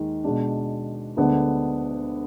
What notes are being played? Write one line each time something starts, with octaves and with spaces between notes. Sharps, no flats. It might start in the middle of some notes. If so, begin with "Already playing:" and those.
Already playing: D#2 D#3 G#3
B2 G#3 D4
D2 D3 G#3 B3 D4